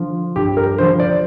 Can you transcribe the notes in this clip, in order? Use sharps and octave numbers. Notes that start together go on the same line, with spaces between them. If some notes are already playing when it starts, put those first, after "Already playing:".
Already playing: D3 F3
G2 G4
A#4
D3 F3 C5
D5